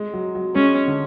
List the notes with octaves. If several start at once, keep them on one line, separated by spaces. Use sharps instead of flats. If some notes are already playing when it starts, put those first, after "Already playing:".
Already playing: G#3
F#3
F#3
G#3 C#4
D3